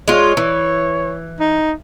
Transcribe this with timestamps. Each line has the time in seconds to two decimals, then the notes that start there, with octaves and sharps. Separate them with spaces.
0.08 G#3 F4 C#5
0.37 E3
1.40 D#4